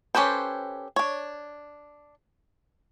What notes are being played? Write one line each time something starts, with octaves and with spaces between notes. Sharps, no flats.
C#4 G4 A4 B4 C5
D4 C#5